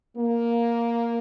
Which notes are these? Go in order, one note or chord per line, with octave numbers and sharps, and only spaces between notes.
A#3